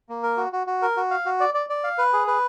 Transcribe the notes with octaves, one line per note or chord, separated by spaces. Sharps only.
A#3
A#4
F#4
F#4
F#4
A#4
F#4
F5
F#4
D5
D5
D5
F5
B4
G#4
B4